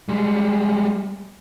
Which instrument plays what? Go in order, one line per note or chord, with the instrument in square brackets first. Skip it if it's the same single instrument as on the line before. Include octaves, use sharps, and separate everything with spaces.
[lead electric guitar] G3 G#3